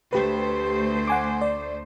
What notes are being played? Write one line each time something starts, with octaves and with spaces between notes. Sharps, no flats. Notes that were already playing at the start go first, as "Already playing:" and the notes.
D2 A3 G4 B4 C5
F#5 G#5 D6
D5